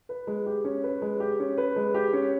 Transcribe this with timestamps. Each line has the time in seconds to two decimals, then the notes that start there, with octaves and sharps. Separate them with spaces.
0.09 B4
0.27 G#3
0.46 G4
0.64 C#4
0.84 B4
1.02 G#3
1.20 G4
1.40 C#4
1.58 B4
1.76 G#3
1.94 G4
2.13 C#4